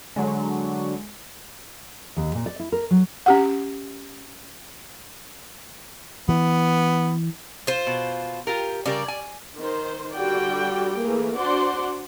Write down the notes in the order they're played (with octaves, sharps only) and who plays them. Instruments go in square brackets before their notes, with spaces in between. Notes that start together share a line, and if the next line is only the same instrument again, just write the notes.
[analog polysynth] D3 F#3 [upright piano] G#3
[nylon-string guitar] D#2
A#2
D5
E4
A#4
F#3
[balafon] C#4 G4 F#5
[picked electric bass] E3 [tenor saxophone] B3
[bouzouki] F4 C5
[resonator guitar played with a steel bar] B2
F4 G4 A#4
[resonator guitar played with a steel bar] C#3 G3 A#4 [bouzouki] D5
[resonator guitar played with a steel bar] G#5
[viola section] D#3 C5
D3 G3 F#4 D5 G5
E3 A3 A#3 G#4
D4 F#4 C5 D5 F#5 C6